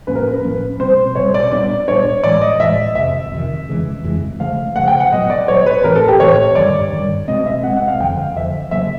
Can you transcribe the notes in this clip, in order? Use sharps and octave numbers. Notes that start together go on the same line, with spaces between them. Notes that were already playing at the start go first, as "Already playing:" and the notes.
A2 F3 A#3 C#4 B4
A#4
B4
A2 F3 A#3 C#4
B2 G3 C4 C5
B2 G3 C4 C#5
D5
A#2 G3 B3 D4 D5
A#2 G3 B3 D4 C#5
A2 E3 G#3 D5
D#5
A2 E3 G#3 E5
F2 C3 D#3 E5
F2 C3 D#3
F2 C#3 E3 G#3
F2 C#3 E3 G#3
C#3 F3 A3 F5
C#3 F3 A3 F#5
G5
F#5
A#2 F#3 B3 D#5
D5
A#2 F#3 B3 C#5
B4
A2 E3 A3 C4 A#4
A4
G4
A2 E3 A3 C4 C#5
G2 D#3 G3 D5
G2 D#3 G3
B2 G#3 C4 D#5
E5
B2 G#3 C4 F#5
F#5
F5
F2 D3 F3 G5
F5
F2 D3 F3 E5
C#3 F#3 A#3 E5